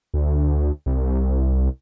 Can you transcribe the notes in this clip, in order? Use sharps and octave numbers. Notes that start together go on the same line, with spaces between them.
D2
C2